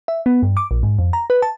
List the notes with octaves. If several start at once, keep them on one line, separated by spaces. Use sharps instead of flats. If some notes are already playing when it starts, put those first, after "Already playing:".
E5
B3
G2
D6
A#1
G#2
F2
A#5
B4
A5